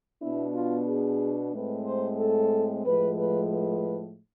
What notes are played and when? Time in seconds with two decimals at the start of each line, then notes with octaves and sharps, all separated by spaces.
0.22 B2 B3 D4 E4
0.55 F4
0.88 G#4
1.53 A2 G#3 C4 B4
1.86 C5
2.19 A4
2.86 A2 F3 G#3 B4
3.18 B4
3.51 B4